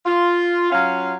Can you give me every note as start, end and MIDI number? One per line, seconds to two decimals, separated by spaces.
0.06 0.71 65
0.72 1.15 54
0.72 1.15 61
0.72 1.15 65
0.72 1.15 77